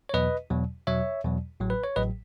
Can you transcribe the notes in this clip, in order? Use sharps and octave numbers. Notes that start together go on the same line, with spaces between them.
C#5
E2 B2 F#3 B4 D#5
E2 B2 F#3
E2 B2 F#3 C#5 E5
E2 B2 F#3
A1 A2 F#3
B4
C#5
A1 A2 F#3 B4 D#5